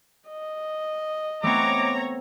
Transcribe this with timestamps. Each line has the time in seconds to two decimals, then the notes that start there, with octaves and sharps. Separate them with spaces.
0.29 D#5
1.43 A3 B3 C4 C#5 A#5 D6